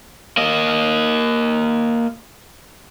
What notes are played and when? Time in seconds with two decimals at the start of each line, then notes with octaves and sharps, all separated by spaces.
0.37 A#3 D#5